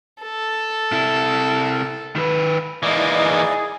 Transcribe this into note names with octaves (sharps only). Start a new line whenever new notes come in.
A4
C3 E4
D#3 B4
E3 G#3 A#3 D#4 E4 D5 D#5
G#4